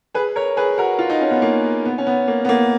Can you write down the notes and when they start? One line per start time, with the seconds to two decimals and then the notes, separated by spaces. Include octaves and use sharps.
0.14 G#4 B4
0.36 A#4 C#5
0.57 G#4 B4
0.78 F#4 A#4
0.99 F4
1.10 D#4
1.21 C#4
1.31 B3
1.42 A#3
1.85 B3
1.98 C#4
2.07 B3
2.28 A#3
2.45 B3
2.49 A#3